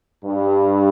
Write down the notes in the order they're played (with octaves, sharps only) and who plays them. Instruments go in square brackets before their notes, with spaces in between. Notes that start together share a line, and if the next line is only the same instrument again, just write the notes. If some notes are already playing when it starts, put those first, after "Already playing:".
[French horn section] G2